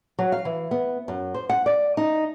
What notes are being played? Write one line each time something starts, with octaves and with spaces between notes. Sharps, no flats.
F#3
F5
E3
B3
F#2
C5
F#5
D5
D#4